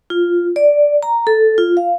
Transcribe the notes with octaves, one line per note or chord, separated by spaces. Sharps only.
F4
D5
A#5
A4
F4
F5